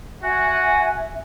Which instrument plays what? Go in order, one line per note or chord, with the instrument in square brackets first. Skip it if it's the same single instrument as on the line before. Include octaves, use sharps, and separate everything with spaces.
[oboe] F#4 [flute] E5 [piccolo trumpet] F#5 [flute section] G#5